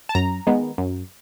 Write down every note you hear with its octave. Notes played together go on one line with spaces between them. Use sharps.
A5
F#2 A#5
D#3 G#3 B3
F#2